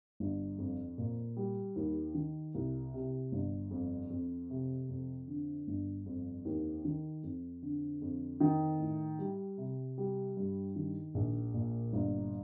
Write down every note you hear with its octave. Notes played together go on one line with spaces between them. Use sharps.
G1
F2
A#2
G3
D#2
D#3
C2
C3
G1
F2
F2
C3
F2
D3
G1
F2
D#2
D#3
F2
D3
F2
D#3
A2
G3
C3
G3
G2
D#3
A#1
A#2
G1